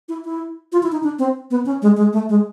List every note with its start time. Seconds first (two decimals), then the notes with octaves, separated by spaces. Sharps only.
0.09 E4
0.25 E4
0.72 F4
0.83 E4
0.92 D#4
1.03 D4
1.19 C4
1.51 B3
1.66 C#4
1.82 G#3
1.97 G#3
2.13 A3
2.29 G#3